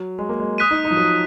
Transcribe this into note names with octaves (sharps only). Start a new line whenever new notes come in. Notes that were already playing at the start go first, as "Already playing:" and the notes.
Already playing: F#3
G#3
A#3
G#3
D#6 F#6 B6 D#7
D#4
D#4
F3
F#3